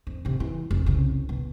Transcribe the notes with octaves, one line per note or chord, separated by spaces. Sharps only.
F2
F2 C3
E3
F1
C2 C#3
B2